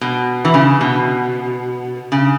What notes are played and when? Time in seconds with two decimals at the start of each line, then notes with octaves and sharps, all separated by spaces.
0.01 B2
0.45 E3
0.54 C#3
0.81 B2
2.12 C#3